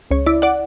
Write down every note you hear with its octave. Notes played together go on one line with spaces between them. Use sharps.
C#2 C#5
E4 D5
D5 F#5